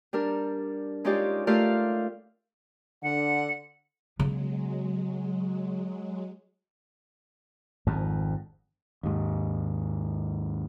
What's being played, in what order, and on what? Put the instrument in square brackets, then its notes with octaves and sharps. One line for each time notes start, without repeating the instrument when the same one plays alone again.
[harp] G3 D4 A#4
G#3 C#4 D#4 F4 G4 D5
A3 F4 G4 A#4 D5 F5
[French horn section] D3 [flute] F#5
[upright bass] C#3 B3 [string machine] F#3 G#3
[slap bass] G#1 F2 G#2
[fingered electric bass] D#2 G#2